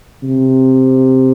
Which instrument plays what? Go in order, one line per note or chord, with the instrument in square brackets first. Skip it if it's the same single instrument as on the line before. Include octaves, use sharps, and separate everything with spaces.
[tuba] C3